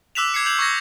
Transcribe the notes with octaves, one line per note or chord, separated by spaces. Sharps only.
D6 E6 F#6 B6 E7 F7
D6 G#6 C7 C#7
D6 G6 G#6 F7 F#7
C#6 G6 G#6 A#6